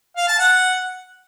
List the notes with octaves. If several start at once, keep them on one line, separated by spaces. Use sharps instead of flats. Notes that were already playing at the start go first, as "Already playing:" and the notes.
F5
A5
F#5